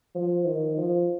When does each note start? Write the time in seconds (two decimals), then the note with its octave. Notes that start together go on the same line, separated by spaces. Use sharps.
0.15 F3
0.46 D#3
0.78 F3